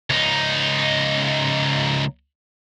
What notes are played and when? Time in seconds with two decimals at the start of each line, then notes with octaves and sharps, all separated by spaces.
0.10 C#2 D#4